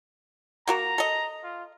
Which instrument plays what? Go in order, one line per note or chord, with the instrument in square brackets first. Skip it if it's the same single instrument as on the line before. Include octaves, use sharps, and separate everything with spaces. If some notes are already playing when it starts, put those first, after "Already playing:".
[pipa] A#3 F#4 A#4 [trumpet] A#5
[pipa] A4 D#5
[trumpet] F4